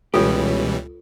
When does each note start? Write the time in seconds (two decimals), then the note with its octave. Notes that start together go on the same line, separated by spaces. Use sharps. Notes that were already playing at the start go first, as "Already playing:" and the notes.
0.14 C#2 B2 E3 G3 C#4 F4 G4 A4